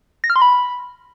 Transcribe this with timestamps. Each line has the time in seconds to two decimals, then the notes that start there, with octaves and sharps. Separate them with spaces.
0.24 A#6
0.30 F6
0.36 C6
0.42 B5